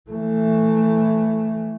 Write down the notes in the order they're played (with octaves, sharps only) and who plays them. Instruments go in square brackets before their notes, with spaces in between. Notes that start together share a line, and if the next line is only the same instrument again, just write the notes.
[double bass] E3 A3